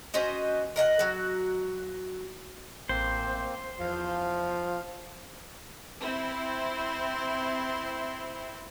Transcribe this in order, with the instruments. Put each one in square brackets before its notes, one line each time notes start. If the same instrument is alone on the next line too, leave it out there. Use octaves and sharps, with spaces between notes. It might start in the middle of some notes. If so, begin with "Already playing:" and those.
[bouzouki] C#4 F#4 C5 D#5
A#4 D#5 F5 F#5
F#3 F#4
[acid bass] A1 [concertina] A#3 C4 [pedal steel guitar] C5
[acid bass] E2 [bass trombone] F3 [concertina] F5
[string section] C4 E4 C6